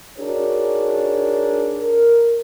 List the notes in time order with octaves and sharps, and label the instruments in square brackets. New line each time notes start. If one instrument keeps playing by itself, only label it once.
[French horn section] D4 D#4 F#4 G#4 A#4 C#5
A#4